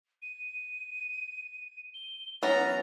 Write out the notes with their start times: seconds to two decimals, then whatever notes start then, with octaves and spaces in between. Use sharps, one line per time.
0.22 D#7
1.94 G7
2.43 E3 F#3 B3 C#4 A#5 A6